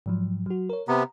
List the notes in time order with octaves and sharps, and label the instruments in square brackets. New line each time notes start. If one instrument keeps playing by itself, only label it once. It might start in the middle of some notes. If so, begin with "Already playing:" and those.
[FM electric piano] G#2 F3 F#3
F#3 F#4
A#4 C#5
[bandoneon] C3 B3 [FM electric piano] A#5